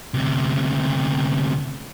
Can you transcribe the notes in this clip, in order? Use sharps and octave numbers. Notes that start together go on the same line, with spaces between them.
D2 C3